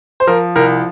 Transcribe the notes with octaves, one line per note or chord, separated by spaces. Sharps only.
C5
F3 A#4
C2 A#4